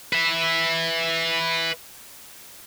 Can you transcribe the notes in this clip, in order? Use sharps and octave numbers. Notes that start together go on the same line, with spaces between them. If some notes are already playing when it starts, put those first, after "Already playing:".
B4 E5